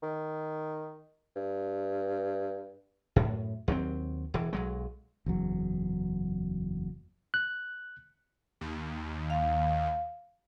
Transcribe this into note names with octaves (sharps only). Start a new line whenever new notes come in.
D#3
G2
F#2 A2
D#2 F#3 B3 C4
E1 E3
B1 F#3 G#3
F#1 E2 F#3
F#6
D#2
F5